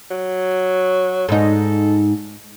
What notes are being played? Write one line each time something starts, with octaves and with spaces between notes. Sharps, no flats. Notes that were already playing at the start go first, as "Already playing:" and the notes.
F#3
G#2 D#4 A4